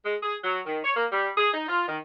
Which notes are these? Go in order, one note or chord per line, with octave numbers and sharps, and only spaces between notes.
G#3
G#4
F#3
D#3
C#5
A#3
G3
G#4
D#4
F4
D#3